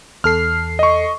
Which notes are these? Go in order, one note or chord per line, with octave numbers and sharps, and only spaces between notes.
E2 A4 F6 C7
D#5 C#6